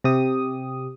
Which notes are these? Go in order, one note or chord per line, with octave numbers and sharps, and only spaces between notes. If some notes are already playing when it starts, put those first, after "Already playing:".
C3 G4 D#6